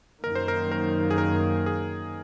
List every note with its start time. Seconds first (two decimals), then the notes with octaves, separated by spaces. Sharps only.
0.23 F#2 D#3 A#3 A#4
0.35 C5
0.48 A#4
0.71 A#4
1.11 G#4
1.18 A#4
1.66 G#4